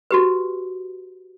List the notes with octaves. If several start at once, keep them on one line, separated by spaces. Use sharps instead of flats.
F#4 G4 B4